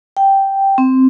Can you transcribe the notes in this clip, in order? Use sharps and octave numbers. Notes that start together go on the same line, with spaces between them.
G5
C4